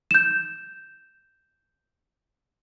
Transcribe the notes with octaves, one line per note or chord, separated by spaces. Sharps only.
G6 E7